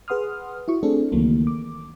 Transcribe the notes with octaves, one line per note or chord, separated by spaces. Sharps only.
G#4 B4 F#5 C6 D#6 F6
E4 F#4 C#6
A3 C4 D4 G#4 A4
C#2 D#3 E3 F#3 A3 A#3
D6